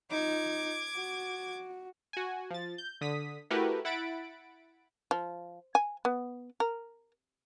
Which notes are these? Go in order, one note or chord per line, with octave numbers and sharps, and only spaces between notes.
D#4 F4 D6 G#6
F#4
F#4 G#5
F3 A6
G6
D3 D#6 B6
A3 E4 F#4 G4 A#4 B4
E4 F#5 B5 A6 D7
F3
G#5
B3
A#4